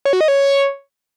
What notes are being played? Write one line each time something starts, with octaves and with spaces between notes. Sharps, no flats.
C#5
F#4
D#5
C#5